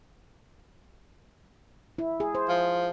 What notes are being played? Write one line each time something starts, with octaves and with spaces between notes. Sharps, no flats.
E4
G#4
C5
F3